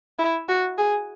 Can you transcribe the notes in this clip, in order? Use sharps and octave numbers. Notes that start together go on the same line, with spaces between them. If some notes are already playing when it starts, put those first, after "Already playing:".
E4
F#4
G#4